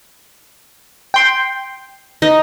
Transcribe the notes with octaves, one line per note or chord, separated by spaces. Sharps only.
G5 C6
D#4 D#5